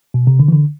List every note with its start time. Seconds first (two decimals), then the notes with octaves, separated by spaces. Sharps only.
0.14 B2
0.27 C3
0.39 D3
0.48 E3
0.52 D3